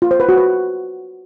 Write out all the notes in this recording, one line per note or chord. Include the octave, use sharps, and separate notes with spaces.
F4
C5
B4
F#4
B4